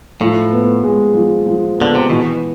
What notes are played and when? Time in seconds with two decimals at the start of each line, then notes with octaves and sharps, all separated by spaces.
0.20 A2 F3
0.52 B3
0.83 G#3
1.14 F3
1.46 F3
1.78 D3 B3
1.95 C3
2.09 B2 E3